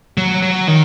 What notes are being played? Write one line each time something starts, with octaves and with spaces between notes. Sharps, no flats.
F#3
F#3
D#3